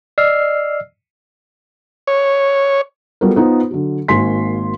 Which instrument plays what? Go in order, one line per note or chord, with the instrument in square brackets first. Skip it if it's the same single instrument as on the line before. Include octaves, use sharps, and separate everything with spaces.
[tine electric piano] D5 D#5 E6 F6 C7
[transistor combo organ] C#5
[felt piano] F#3 G3 B3 F4 A4 A#4
B3 D#4 F4 C5
D3 F#3
G#1 A#3 F#4 G#5 C6 B6